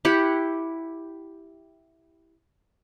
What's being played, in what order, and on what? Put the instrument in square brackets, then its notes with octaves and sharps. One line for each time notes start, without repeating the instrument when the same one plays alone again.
[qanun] E4 G4 F#5